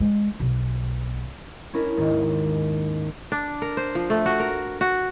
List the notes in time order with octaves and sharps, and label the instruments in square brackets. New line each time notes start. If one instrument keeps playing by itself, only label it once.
[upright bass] G#3
B1
[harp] C#4 D4 E4 A#4
D#2 G#2 D#3
[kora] D4
A#4
C5
F3
A3
F#4
A#4
F#4